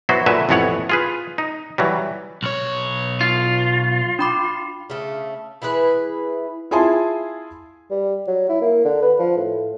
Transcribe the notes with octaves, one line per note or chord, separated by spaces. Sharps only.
F#3 B3 E4 F#4 C5
A#2 D3 F#3 B4 E5
A1 F2 E3 B3 C#5 F#5
F4 G#4 B4
D#4
E3 F#3 G3
B1 C#5
F4
D4 B5 D6
C#3 A3
E3 E4 G#4 B4
E4 F4 G#4 G#5 A5 C6
G3
F#3
E4
A#3
D3
B4
F3
A2